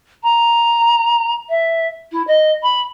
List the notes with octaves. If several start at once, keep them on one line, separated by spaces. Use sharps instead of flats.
A#5
E5
E4
D#5
B5